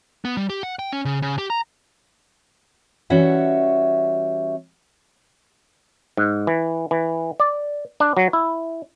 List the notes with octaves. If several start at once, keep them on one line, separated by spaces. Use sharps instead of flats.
B3
G3
G4
F#5
G5
C#4
C#3
C#3
G4
A#5
E3 G3 C#4 F#4 E5 F#5
G#2
E3
E3
D5
D4
F#3
E4